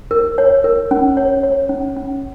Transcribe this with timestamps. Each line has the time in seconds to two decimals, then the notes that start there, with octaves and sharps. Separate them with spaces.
0.11 A#4
0.38 C#5
0.64 A#4
0.91 C#4
1.17 C#5
1.43 C#5
1.69 C#4
1.96 C#4